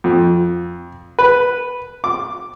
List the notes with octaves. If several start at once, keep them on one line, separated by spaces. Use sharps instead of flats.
F2
B4
D6